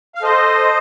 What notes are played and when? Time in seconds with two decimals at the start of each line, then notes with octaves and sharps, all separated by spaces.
0.15 F5
0.23 A4 C5 D#5